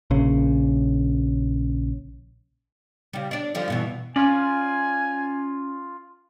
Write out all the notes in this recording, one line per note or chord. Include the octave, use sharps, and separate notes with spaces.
A#1 C#3
C#3 G3
D4 D5
D3 F3 G3
G2 B2 E3
C#4 F4 D5 G#5